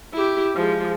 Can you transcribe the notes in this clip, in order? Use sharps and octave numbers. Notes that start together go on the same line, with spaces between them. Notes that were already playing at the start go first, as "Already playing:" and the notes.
E4 G4
F3 G#3